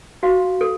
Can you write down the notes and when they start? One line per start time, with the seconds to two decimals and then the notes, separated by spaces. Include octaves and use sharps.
0.23 F#4 F5
0.61 A4